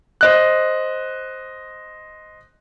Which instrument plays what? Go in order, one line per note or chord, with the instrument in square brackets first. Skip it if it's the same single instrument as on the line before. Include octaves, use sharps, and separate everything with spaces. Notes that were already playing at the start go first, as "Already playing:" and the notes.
[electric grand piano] C5 D#5 F#6